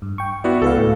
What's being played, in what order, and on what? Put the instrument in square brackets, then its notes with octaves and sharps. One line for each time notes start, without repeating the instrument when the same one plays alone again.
[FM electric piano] G2
G5 C#6
[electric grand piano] B3 E4 F#4 [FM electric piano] D5
[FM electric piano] C#2 B4 F5 [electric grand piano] A4
[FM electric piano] A2